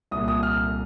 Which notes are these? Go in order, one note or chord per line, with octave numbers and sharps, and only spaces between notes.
C2 A#2 D#6
D#6
F6